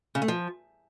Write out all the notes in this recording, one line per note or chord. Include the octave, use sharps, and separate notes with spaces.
C#3
A3
F3